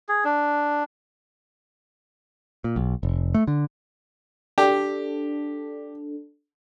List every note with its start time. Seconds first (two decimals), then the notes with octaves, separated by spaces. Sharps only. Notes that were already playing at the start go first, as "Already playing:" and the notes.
0.09 G#4
0.24 D4
2.64 A#2
2.76 B1
3.03 F1
3.34 A3
3.48 D3
4.58 D4 G4 A4